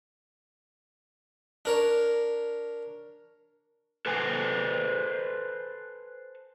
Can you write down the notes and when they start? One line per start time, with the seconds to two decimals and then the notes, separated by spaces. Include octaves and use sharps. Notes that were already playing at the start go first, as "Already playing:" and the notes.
1.65 D4 A#4 C#5
4.06 A4 B4 C5 G#5